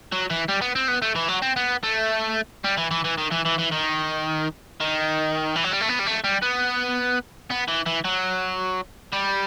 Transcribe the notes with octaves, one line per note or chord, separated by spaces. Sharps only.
F#3
E3
G3
B3
C4
B3
A3
E3
F#3
C4
B3
A3
G3
E3
E3
E3
D#3
E3
E3
E3
D#3
D#3
E3
F#3
G3
A3
B3
G3
A3
G3
B3
B3
E3
E3
F#3
G3